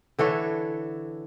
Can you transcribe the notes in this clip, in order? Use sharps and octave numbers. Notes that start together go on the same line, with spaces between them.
D3 E3 A4 C#5